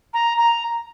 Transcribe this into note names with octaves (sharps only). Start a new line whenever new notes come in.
A#5
A#5